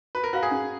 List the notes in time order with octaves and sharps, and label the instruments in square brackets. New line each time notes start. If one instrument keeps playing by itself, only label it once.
[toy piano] F#4 [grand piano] B4
[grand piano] A#4
[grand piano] F#4 [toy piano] B4 F5
[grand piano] G#4
[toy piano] C#4